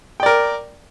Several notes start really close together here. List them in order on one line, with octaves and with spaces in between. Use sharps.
G5 D5 A#4